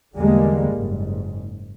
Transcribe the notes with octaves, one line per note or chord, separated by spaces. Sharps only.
E2 D3 G3 G#3 A#3
F#1 G#2